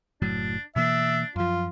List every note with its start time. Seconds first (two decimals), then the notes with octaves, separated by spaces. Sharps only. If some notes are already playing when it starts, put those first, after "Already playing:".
0.22 F#1 A2 F#3 D4
0.76 B2 E3 A#3 D4 E5
1.36 F#2 F3 F4